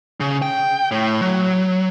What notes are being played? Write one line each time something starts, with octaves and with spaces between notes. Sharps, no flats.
C#3
G5
A2
F#3